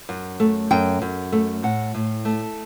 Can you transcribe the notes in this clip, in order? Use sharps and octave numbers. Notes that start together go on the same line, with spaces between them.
F#2
A3
F#2 G5
F#2
A3
A2 F#5
A2
A3